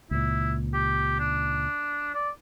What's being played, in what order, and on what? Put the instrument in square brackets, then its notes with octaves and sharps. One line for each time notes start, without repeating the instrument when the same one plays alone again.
[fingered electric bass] C#2 A#2 [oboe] E4
[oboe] G4
D4
D5